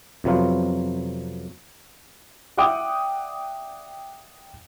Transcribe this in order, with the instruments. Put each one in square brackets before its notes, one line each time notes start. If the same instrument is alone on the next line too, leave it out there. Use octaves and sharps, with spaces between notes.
[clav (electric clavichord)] F2 C3 F#3 B3 F4
[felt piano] D5 E5 F#5 G5 D6 D#6